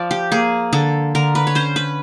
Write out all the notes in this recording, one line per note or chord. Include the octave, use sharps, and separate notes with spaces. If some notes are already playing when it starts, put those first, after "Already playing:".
Already playing: F3 D5
G4
A#3 G#4
D3 A4
D3 A#4
B4
C#5
C#4 C5
B4